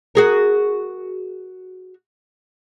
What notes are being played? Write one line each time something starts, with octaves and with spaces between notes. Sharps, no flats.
F#4 G#4 A#4